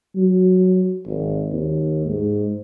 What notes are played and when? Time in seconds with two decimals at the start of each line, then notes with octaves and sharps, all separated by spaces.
0.16 F#3
1.07 G#1
1.52 D#2
2.07 G#2